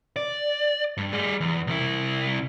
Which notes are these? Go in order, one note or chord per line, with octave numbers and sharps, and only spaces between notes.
D5
G2
G3 G#4
E2
C2 E4